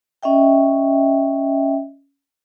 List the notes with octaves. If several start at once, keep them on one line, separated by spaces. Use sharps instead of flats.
C#4 D#5 E5 G5